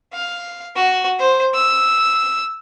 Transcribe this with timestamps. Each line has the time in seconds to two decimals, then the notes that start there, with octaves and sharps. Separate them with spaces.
0.13 F5
0.76 F#4
1.19 C5
1.54 E6